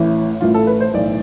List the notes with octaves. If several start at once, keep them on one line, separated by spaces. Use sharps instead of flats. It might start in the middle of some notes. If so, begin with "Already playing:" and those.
Already playing: A1 A2 E3
A1 A2 E3 F4
A4
B4
C5
B1 A2 E3 D5